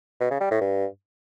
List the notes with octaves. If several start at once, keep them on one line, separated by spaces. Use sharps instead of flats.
B2
C#3
G3
A2
G2